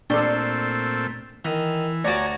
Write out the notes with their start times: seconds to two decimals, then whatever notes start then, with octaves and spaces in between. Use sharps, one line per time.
0.10 A#2 A3 C4 D4 A4 C6
1.45 D#3 E3
2.04 D2 F#4 C#5 D5 G#5 A#5